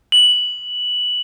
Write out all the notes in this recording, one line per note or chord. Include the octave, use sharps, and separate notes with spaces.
F#7